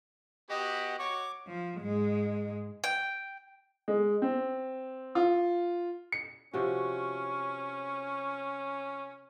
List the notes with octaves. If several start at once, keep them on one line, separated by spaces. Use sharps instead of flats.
B3 F#4 G4 D#5
F#4 C#5 C#6 D6
F3
G#2 G#3
G5
G#3
C4
F4
C#7
C3 F3 C#4 F#4 C#6